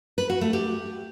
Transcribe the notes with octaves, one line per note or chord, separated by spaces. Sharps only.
B4
F#4
A3
G4